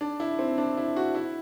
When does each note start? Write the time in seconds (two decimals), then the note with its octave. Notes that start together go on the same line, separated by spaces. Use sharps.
0.01 D4
0.20 E4
0.39 C4
0.58 D4
0.77 E4
0.96 F#4
1.15 E4